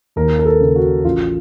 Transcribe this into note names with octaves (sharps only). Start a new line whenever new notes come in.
D#2 A#4
A#4
A4
C#3
F#4
A1 F4